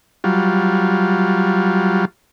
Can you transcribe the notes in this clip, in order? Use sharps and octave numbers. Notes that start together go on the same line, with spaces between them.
F#3 G3 F4